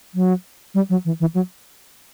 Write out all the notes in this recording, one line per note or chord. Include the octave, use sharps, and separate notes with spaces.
F#3
G3
F#3
E3
E3
F#3